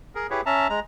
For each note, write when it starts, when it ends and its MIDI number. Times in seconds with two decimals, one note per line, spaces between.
0.15 0.27 68
0.15 0.27 70
0.30 0.41 64
0.30 0.41 67
0.30 0.41 68
0.30 0.41 71
0.30 0.41 73
0.46 0.67 61
0.46 0.67 76
0.46 0.67 81
0.46 0.67 82
0.69 0.80 56
0.69 0.80 82